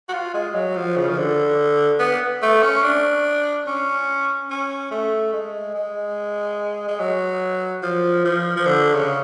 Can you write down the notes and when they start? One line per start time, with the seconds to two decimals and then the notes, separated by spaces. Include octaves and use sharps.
0.09 F#4
0.13 F4
0.34 G#3
0.54 F#3
0.76 F3
0.97 C#3
1.10 F3
1.18 D3
2.00 B3
2.42 A3
2.63 C#4
2.83 D4
3.67 C#4
4.51 C#4
4.91 A3
5.33 G#3
5.75 G#3
6.88 G#3
7.00 F#3
7.83 F3
8.24 F3
8.56 F3
8.66 D3
8.94 C#3